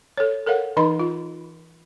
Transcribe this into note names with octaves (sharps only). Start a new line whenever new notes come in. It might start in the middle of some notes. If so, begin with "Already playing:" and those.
A4 C#5
A4 A#4 C#5 F5 F#5
E3 D#4 D#5 B5 C6
F4